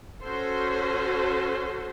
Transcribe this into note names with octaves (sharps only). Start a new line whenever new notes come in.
C#4 F#4 A4 C5